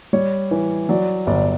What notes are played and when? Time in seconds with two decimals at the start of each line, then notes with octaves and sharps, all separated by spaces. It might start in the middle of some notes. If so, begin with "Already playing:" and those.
0.13 G3 C#5
0.51 E3
0.89 F#3 D5
1.27 G1 D5